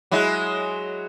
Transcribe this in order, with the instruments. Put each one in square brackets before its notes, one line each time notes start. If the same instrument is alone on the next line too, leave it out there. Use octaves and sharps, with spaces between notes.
[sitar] F#3 G#3 E4